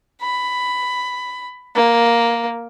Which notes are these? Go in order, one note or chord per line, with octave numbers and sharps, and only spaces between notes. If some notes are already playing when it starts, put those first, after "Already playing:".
B5
A#3